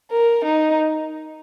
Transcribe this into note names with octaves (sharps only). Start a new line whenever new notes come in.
A#4
D#4